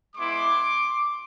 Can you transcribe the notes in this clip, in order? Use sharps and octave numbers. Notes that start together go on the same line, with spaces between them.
G#3 B3 E4 C6 D6